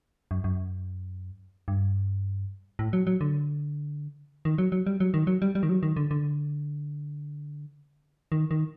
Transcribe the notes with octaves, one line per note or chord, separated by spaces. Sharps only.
F#2
F#2
G2
A2
F#3
F#3
D3
D#3
F#3
F#3
G3
F#3
D#3
F#3
G3
G3
D#3
F#3
D#3
D3
D3
D#3
D#3